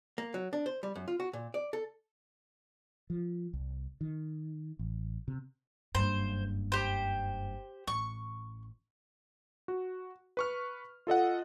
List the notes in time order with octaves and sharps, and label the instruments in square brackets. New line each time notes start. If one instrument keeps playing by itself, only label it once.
[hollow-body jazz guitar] A#3
F#3
D4
C5
G3
F#2
F4
F#4
A#2
D5
A4
[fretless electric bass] F3
C2
D#3
A1
C3
[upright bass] F#1 G2 [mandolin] C5
[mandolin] G4 C5
[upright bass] A1 [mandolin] C#6
[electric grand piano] F#4
B4 C#6 F6
F4 A4 D#5 F#5